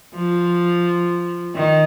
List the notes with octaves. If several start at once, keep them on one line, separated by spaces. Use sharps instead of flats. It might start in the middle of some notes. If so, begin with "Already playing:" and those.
F3
D#3